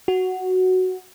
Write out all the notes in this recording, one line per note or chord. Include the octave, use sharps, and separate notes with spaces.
F#4